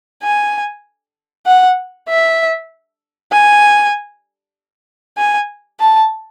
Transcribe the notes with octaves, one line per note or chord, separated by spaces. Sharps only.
G#5
F#5
E5
G#5
G#5
A5